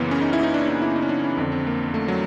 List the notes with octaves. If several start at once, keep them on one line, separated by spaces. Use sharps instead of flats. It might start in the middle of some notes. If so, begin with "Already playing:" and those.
Already playing: F#2 C#3 E3 A#3 B3
C#4
D#4
E4
D#4
D4
D#4
E4
D#4
C#4
D4
C#4
F2 D3 C4
C4
A#3
A3
F#3